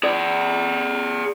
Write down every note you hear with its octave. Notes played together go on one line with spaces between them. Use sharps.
G#4 D5